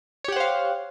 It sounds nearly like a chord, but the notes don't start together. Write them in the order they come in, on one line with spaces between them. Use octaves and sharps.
C#5 G4 F#5 C5 F5